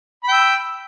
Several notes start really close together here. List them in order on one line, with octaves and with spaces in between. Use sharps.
B5 G5 E6